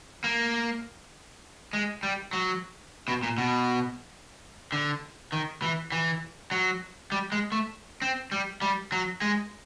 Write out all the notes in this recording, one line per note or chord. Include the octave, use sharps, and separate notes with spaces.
A#3
G#3
G3
F#3
B2
A#2
B2
D3
D#3
E3
E3
F#3
G3
G#3
A3
C4
G3
G3
F#3
G#3